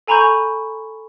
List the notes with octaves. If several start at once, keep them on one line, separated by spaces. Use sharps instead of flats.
A4 G#5 A#5 B5 C#6 G6